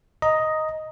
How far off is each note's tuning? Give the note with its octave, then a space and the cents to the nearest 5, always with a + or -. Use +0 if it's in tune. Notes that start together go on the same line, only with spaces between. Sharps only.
D#5 +5 A#5 +0